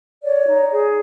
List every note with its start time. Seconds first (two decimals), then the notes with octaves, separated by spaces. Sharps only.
0.23 C#5 D5
0.47 D#4
0.71 G#4